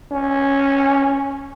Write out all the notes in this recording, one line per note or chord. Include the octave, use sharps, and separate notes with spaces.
C#4